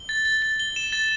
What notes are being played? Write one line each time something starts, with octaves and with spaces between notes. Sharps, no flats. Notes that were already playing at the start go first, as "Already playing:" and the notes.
Already playing: G7
A6
A6
A6
G7
E7
A6